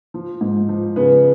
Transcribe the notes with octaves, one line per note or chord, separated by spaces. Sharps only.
F3
G#2
F3
C#3 B3